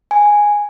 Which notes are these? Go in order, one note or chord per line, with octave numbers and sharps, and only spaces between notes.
G#5